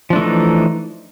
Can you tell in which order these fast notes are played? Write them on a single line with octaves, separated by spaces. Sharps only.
F3 D4 A3 E3 D#4